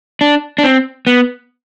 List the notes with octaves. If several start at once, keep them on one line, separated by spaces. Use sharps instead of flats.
D4
D4
C4
B3